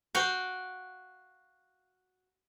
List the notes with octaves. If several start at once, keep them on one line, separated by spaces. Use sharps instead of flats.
F#4 F5 G5